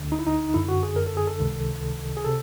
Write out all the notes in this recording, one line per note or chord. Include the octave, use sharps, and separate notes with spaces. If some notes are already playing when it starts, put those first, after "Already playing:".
Already playing: D2 D3
D#4
E4
D#4
F#2 D3 E4
F#4
G#4
A#4
A4
G#4
A4
C#2 C3 D#3
G#4
C3 A4